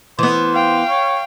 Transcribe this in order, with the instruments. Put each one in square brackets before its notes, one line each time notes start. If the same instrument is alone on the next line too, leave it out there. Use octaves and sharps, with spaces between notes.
[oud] E3 B3 [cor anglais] C5
[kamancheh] F5 G5
[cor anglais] C#5